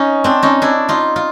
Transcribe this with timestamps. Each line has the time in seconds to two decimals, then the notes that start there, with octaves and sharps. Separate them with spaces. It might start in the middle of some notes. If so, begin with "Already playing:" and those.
Already playing: C#4 D#4
0.24 C4 D4
0.43 C#4 D#4
0.62 D4 E4
0.89 D#4 F4
1.16 F4